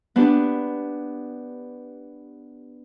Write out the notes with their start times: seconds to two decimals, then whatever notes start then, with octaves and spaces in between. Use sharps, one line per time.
0.16 B3 D4 G4